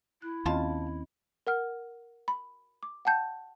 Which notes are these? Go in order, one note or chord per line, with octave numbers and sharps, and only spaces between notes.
E4 F#6
D#2 C#3 C4 C#4 F4 D#5 A5
A#4 F#5 F6
B5
D6
F#5 G5 A5 G6